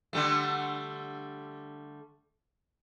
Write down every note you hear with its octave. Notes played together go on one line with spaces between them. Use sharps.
D3 G3 A3